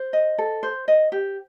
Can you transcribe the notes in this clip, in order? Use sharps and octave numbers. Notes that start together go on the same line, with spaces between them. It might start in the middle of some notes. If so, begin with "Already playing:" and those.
Already playing: C5
D#5
A4
C5
D#5
G4